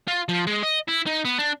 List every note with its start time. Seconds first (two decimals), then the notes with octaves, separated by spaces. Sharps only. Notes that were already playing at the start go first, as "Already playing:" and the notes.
0.08 F4
0.29 F3
0.47 G#3
0.63 D#5
0.88 E4
1.07 D#4
1.25 B3
1.38 D4